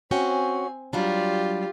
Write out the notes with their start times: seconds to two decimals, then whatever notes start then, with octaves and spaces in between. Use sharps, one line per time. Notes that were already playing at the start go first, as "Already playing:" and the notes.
0.11 C4 C#4 F#4 G5 G#5
0.93 F#3 G3 D4 F4 G4